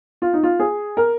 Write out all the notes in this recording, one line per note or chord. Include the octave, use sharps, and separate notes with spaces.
F4
D#4
F4
G#4
A#4